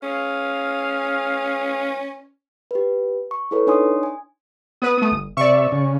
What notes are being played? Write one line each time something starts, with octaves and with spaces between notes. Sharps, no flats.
C#4 G#4 F5
G4 B4
C#6
E4 G#4 A4 B4 C#5
D4 D#4 C#5 G#5 C6 D#6
G#5
B3 B4 D#6
A3 B3
G1
C3 D5 E5 C#6
C#3